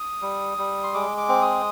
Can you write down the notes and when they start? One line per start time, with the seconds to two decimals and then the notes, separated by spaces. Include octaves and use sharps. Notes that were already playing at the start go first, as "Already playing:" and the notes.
Already playing: D#6
0.22 G3
0.58 G3
0.83 C6
0.94 G#3 D6
1.17 D6
1.29 C4
1.42 D#6